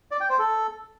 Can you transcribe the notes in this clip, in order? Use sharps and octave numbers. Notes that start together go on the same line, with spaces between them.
D5
G5
C5
A4